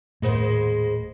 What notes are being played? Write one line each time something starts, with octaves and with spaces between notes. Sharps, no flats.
D#1 A2 G#3 A#3 C5